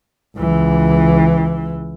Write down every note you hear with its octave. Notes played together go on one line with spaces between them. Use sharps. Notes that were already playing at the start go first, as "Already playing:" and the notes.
C#2 E3